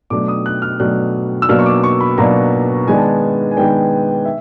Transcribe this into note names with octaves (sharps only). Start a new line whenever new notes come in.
B2 F#3 A3 D4 D6
D#6
F#6
F6
B2 F#3 A3 D4 F#6
E6
B2 F#3 A#3 D4 F6
C#6
D6
C#6
B5
B2 F#3 A#3 D4 A#5
D#3 G#3 B3 D4 G#5
A5
G#5
G#5
D#3 G#3 B3 D4 G5
E5